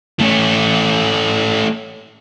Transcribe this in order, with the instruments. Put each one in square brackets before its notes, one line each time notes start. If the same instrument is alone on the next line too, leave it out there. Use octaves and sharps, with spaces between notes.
[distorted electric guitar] A3 C#4